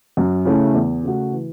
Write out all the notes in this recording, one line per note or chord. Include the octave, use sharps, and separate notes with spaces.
F#2
C#3 A3 C#4 E4
E2
C#3 A3 F#4
E3